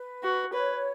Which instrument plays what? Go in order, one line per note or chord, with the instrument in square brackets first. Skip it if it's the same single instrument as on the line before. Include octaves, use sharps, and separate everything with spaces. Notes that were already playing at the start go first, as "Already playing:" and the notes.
Already playing: [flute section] B4
[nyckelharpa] F#4
[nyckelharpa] B4 [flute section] C#5